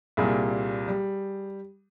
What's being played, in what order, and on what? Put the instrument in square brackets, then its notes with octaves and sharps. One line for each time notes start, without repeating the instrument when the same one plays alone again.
[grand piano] C2 A#2 G3 G#4
G3